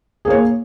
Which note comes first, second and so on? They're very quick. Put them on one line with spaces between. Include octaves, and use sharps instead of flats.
G#4 A#3 C#5